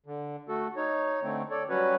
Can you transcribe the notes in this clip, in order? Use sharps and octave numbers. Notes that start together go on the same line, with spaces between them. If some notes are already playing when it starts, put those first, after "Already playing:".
D3
A3 F#4 A4
D#4 C#5
D3 A3 C4
A4 C#5 D5
F#3 G3 C#4 F#4 B4 C#5